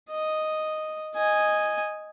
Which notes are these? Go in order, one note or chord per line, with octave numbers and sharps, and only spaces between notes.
D#5
D#5 G#5